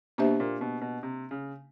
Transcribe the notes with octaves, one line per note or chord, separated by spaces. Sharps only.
B2 A#3 D4 G4 C5 E5
A#2
B2
B2
C3
C#3